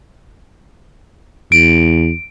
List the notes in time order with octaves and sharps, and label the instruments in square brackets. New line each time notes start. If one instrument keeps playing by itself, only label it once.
[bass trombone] E2 [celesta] D7